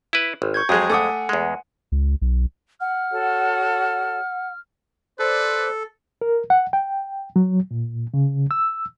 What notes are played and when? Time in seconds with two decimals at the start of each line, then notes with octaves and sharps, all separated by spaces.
0.13 E4 B4
0.42 G#1
0.54 C#6 G6 G#6
0.69 F2 F#3 G#3 G#4 D#6
0.90 A3 F#5 G#5 D6 D#6
1.29 E2 G#3
1.92 C#2
2.22 B1
2.80 F#5 F6
3.11 F#4 A4 C#5
5.19 A4 B4 C5 D5
6.21 A#4
6.50 F#5
6.73 G5
7.36 F#3
7.71 A#2
8.14 C#3
8.51 E6